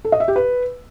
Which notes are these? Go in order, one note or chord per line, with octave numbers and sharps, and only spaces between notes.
A4
D#5
E5
G4
B4